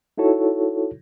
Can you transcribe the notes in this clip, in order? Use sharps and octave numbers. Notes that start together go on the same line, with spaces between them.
D#4 E4 F#4 A4 C#5